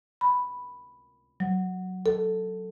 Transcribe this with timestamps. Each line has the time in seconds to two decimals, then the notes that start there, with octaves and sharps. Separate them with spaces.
0.21 B5
1.40 F#3
2.06 A4